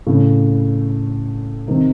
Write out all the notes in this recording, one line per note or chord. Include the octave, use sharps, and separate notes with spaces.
A2 C#3
C3 D#3